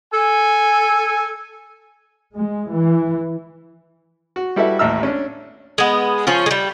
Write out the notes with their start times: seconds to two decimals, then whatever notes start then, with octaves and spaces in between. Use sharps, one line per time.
0.13 A4 G#5
2.36 G#3
2.71 E3
4.36 F#4
4.56 G3 E4 F#4 A4 B4 E5
4.79 A1 D#2 A2 E5 A#5 E6
5.03 C#4 D4
5.78 G#3 B3
6.27 F3 C#4 F4
6.46 G3 G#3